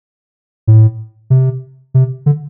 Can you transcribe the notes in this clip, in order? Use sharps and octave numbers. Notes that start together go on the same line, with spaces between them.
A2
C3
C3
D3